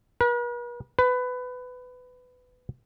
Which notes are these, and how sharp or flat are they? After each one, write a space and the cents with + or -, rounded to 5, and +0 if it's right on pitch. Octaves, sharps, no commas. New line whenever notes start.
B4 -45
B4 +20